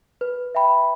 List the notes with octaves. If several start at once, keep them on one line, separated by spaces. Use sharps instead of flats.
B4
E5 G5 B5